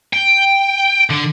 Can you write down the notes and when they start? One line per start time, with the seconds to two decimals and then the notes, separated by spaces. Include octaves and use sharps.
0.13 G5
1.10 D3